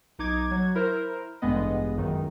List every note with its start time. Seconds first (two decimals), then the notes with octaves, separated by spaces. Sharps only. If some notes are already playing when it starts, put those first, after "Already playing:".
0.19 B1 D#4 D6 G#6
0.49 F#3 G#6
0.75 E4 A#4 C5
1.42 A1 G2 G#3 B3 D#5
1.97 C#2 F#2 D#3